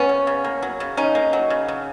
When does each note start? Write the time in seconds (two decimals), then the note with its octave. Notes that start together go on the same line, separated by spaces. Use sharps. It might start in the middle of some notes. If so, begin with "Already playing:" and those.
Already playing: B3 C#4
0.09 C#3
0.27 C#3
0.44 A#3
0.62 F#3
0.80 C#3
0.97 C#3 C#4 D#4
1.15 A#3
1.33 F#3
1.50 C#3
1.68 C#3